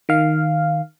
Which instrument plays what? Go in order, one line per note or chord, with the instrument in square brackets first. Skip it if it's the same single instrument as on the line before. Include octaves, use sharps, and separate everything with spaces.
[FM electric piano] D#3 F5